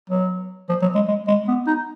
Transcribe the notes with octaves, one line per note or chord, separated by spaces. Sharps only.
F#3
F3
F#3
G#3
G#3
G#3
B3
D#4